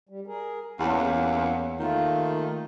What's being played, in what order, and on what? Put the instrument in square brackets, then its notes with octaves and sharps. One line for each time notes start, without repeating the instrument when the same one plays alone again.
[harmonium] G3
G#4 A#4
[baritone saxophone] E2 [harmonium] A#3 C#4 F#5
[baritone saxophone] D#3 [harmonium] A3 A#3 F4